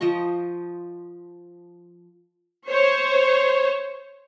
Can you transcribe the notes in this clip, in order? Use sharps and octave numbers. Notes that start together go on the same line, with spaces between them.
F3 C5 D#5 C#6
C5 C#5